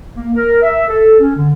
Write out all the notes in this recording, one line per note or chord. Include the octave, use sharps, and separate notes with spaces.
A#3
A#4
E5
A4
C#4
D3